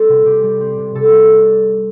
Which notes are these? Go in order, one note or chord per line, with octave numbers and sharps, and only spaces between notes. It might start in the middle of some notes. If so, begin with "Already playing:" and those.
Already playing: G3 C4 A4
C3
C3 G4
G3
C4
C3
C3 A4
G3